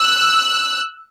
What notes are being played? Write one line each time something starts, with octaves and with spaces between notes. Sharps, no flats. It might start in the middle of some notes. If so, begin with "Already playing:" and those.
Already playing: E6 F#6